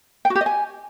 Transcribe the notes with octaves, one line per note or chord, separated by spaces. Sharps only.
G5
F#4
G4
D#5
G#5